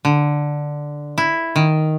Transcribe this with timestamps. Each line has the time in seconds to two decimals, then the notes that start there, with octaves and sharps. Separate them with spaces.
0.05 D3
1.18 E4
1.56 D#3